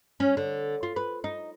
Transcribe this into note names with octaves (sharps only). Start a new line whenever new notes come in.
C#4
D3
F4
B4
D#4